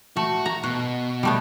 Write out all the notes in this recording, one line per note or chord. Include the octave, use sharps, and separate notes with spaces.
A3 F#4
A#5
B2 F#4
G3 A3 B3